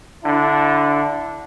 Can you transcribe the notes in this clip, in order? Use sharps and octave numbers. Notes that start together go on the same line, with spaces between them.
D3 D4 E4